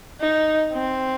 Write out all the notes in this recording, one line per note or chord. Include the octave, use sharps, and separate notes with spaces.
D#4
C4